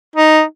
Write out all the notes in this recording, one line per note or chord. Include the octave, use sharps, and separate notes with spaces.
D#4